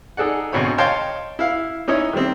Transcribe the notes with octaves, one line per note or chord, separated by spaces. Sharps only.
D#4 G#4 A4 D5 F#5
D2 G#2 B2 C4 C#5 B5
C#5 D#5 F5 G5 A5 C6
E4 F5
C#4 D#4 E4 C#5
D#3 G3 A3 C4